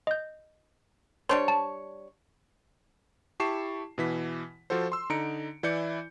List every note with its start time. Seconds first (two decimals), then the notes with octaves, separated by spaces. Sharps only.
0.07 D#5 G6
1.29 G3 D4 C5 C#5 C6
1.48 A5
3.40 E4 G4 A5 C#6 C7 E7
3.98 B2 E3 B6
4.70 F3 F4 F#4 A4 C5
4.92 C6 E6
5.10 D3 D#4 A#5 C#7 D7
5.63 E3 E4 D5 G6 C#7